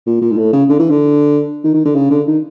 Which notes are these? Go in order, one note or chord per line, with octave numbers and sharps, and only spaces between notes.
A#2
A#2
G#2
A2
C#3
D3
E3
D3
D#3
D#3
D3
C#3
D3
D#3